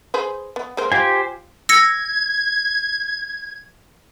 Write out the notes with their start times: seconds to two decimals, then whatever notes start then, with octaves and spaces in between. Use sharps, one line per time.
0.14 G#4 B4 C5
0.56 B3
0.77 G#3 A#3 C5
0.92 F4 G4 C5 G#5
1.69 E6 G#6 A#6 C#7